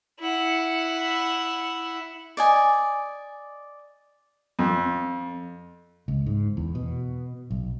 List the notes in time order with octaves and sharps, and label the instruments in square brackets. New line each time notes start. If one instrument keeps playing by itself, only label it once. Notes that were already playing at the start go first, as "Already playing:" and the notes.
[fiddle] E4 F#5
[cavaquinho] D5 D#5 G#5
[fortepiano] F2
[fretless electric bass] C#2
G#2
E2
B2
B1